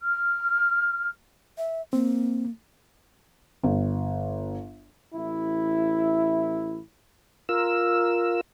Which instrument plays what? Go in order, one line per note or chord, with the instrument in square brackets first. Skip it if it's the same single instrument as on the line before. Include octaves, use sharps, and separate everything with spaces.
[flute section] F6
[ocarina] E5
[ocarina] A#3 [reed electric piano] C4
[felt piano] G1
[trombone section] A1 E4
[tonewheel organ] F4 A#4 E6